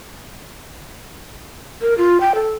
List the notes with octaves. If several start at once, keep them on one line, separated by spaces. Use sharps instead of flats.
A#4
F4
G5
A4